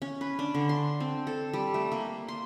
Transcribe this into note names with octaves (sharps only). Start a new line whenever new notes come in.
C#4
B4
D4
D3
C6
C4
A4
G3
A3
A#3
C6